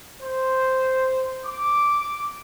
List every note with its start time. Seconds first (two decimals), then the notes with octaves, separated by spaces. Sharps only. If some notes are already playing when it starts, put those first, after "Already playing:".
0.23 C5
1.45 D6